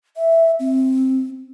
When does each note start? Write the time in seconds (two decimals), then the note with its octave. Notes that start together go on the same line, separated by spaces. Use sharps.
0.17 E5
0.59 C4